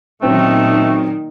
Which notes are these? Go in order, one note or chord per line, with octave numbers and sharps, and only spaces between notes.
A#2 D#3 F#3 A3 C4 C#4